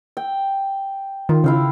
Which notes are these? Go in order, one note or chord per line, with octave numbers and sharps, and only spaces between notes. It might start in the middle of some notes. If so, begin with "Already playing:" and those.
G5
D#3 F4
C#3 E4 F5 G5